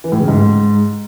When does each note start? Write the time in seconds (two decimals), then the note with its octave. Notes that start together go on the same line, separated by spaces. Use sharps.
0.04 E3
0.12 A2
0.20 C#3
0.28 G#2